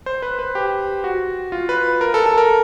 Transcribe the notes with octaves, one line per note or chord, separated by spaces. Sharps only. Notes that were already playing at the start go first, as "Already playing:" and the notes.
C5
B4
B4
G4
F#4
F4
B4
A#4
A4
A4
A#4